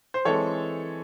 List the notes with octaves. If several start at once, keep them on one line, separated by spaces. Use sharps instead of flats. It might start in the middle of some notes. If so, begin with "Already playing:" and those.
C5
E3 G#3 C4 A4 C#5